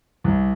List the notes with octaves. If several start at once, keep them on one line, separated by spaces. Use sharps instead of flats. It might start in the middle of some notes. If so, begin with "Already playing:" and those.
C2